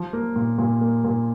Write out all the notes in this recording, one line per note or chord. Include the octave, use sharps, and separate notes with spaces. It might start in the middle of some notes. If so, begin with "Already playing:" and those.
Already playing: F3
A#3
A#2
A#2
A#3
A#2